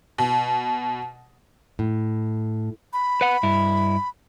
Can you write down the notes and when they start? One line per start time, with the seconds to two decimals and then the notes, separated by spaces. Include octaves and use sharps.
0.18 B2
1.79 A2
2.93 B5
3.21 B4 F#5
3.43 G2 E4